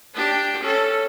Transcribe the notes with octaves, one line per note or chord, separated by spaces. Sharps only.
D4 G4
C#4 A4